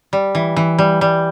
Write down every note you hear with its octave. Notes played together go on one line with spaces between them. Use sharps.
G3
E3
E3
G3
G3